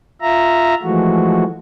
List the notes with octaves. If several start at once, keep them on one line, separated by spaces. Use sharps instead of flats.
F4 E5 A#5
E3 F3 G#3 A3 F#4